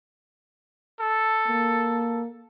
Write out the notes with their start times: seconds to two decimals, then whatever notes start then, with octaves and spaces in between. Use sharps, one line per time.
1.00 A4
1.48 A#3